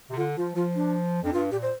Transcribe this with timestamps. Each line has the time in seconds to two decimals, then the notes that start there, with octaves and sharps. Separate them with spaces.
0.10 C3
0.17 D3 F4
0.37 F3 F4
0.55 F3 F4
0.75 D4
1.23 F2 D4
1.33 G2 F4
1.51 A#2 G4
1.62 C5